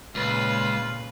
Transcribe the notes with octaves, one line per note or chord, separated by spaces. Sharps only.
C#2 A#2 C#3 F4 B4